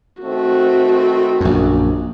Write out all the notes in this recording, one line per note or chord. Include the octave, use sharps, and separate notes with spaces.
D#3 A3 C4 F#4
A#1 F#2